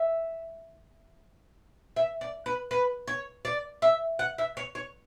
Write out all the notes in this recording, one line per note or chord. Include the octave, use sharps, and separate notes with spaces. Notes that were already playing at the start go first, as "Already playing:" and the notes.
Already playing: E5
E5
D5
B4
B4
C#5
D5
E5
F#5
E5
C#5
C#5